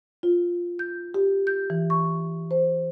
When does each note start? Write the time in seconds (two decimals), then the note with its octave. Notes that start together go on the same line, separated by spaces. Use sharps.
0.23 F4
0.79 G6
1.14 G4
1.47 G6
1.70 E3
1.90 C#6
2.51 C5